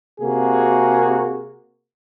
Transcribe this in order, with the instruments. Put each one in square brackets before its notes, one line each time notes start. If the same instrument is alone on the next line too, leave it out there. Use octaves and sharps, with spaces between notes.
[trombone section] C3 A#3 F#4 G#4